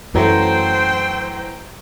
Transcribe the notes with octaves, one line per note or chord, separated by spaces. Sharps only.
F#2 E3 F#3 A3 C5 G5